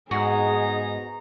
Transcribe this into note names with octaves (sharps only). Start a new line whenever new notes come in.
G#2 B3 D#4 F#4 G#4 A#5